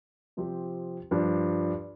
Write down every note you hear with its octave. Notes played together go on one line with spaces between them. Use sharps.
C3 F3 C4 G4
G2 F3 D4